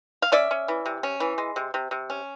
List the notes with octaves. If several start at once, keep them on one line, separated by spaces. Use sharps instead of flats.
F5
C#4 D5 E5
C#4
E3
C3
C#4
E3
G#3
C3
C3
C3
C#4